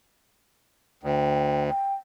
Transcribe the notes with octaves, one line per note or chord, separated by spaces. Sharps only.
D2 G5
G5